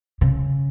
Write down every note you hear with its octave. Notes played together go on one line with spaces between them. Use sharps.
C#3